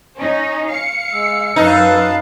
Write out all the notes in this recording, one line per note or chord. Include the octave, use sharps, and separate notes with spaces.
C#4 D#4
F5 C#7
G#3 E6
F#2 D#4 B4 F5 A5